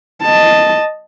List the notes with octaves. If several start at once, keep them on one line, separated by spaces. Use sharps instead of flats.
D#5 A5